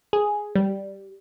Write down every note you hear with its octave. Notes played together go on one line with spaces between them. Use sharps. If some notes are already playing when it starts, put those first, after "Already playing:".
G#4
G3